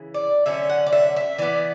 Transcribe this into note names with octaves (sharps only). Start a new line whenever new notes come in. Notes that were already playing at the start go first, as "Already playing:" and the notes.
Already playing: C#3 E3
D5
D3 F#3 C#4 E5
F#5
D5
E5
E5
E3 B3 D5